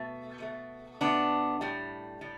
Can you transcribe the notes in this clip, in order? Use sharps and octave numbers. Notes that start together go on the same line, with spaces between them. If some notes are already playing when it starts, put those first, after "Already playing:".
Already playing: B2 A3
B2 A3
B2 A3 B3 D4
A2 G3
A2 G3